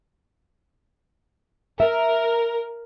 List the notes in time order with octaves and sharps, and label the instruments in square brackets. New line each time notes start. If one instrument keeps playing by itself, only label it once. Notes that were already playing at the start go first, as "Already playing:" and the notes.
[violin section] A#4 [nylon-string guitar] E5